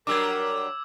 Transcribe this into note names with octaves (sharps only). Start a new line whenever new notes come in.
F#3 G3 D4 A#4 D6 E6 G#6